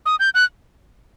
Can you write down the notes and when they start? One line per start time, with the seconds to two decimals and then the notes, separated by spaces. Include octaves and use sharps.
0.06 D#6
0.20 G6
0.35 F#6